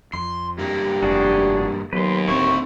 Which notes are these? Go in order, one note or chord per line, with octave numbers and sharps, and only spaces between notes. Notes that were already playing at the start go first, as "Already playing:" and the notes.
F2 C6
G2 A#3 G4
F1 F2 D4 F#4 G#4
D#2 F#3 B3 B4 C6
D1 C4 E4 C5 C#6